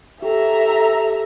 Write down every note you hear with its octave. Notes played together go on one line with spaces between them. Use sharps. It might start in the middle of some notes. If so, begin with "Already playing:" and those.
G4 A4 E5 A#5